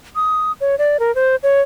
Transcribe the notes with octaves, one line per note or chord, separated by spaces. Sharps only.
D#6
C#5
D5
A#4
C5
C#5